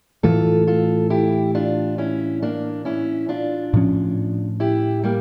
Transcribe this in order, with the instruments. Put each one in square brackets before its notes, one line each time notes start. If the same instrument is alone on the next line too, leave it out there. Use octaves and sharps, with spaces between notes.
[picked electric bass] A2 E3 A3 [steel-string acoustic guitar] F4 A4
[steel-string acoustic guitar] F4 A4
E4 G4
D4 F4
C#4 E4
A#3 D4
C#4 E4
D4 F4
[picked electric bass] A2 F3 C#4
[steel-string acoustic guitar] E4 G4
G3 A#3